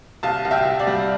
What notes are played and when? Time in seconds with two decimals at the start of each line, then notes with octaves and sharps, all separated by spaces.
0.23 C2 F5 A5
0.45 C2
0.51 E5 G5
0.65 C2
0.79 D5 F5
0.87 G3